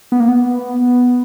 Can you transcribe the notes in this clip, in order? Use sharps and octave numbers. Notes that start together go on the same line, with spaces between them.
B3
A#3
B3